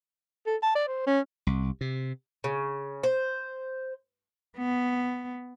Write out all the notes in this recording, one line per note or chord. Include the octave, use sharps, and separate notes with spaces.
A4
A5
D5
C5
C#4
C2
C3
C#3
C5
B3